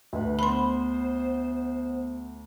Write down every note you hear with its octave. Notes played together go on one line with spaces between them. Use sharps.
D2 B4
B3 C5 B5 C6